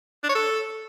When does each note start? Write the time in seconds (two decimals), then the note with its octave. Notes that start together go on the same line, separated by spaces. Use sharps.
0.24 D4
0.29 C#5
0.35 A4